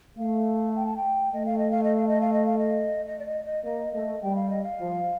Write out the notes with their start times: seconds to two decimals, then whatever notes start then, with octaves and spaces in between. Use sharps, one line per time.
0.18 A3 F5
0.76 G5
0.86 A5
0.97 G5
1.33 A3 D#5
1.46 F5
1.58 D#5
1.71 F5
1.84 D#5
1.96 F5
2.08 D#5
2.21 F5
2.33 D#5
2.46 F5
2.58 D#5
3.07 D#5
3.19 D5
3.26 D#5
3.45 D#5
3.64 A#3 D#5
3.93 A3 D#5
4.22 G3 G5
4.36 F5
4.50 D#5
4.64 F5
4.80 F3